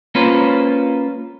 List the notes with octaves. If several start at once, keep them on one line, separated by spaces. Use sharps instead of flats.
A#3 C#4 F4 B4 C5